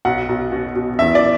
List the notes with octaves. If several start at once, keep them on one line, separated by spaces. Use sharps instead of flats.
B1 F#5
B1
B2
B2
E2 E5
D5